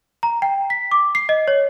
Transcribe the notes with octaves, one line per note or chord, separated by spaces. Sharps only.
A#5
G5
B6
D6
C7
D#5
C#5